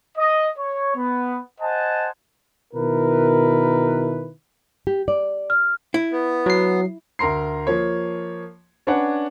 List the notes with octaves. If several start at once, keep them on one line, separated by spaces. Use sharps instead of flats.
D#5
C#5
B3
C5 D#5 F#5 G#5 A5
B2 D#3 E4 A#4 B4
G4
D5
F6
E4
B3
F#3 C7
D2 A#4 A#5 C6 C7
F3 A#3 C#5
C#4 D4 B4 C#5 D5 F#5